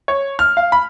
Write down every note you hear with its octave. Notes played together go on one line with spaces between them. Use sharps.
C#5
F6
F5
B5